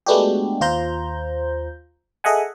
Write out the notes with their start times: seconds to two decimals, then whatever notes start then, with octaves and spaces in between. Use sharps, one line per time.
0.06 G#3 A3 B3 D4 F#4 G4
0.61 D#2 F4 C5 A#5 G6
2.24 G#4 A4 D#5 E5 F#5 G#5